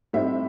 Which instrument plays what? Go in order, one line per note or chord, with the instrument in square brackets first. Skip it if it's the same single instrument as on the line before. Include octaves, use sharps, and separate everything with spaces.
[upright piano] A2 G3 C4 D#4 E5